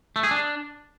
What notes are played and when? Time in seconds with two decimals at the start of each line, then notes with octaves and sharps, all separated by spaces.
0.16 A3
0.23 G#4
0.31 D4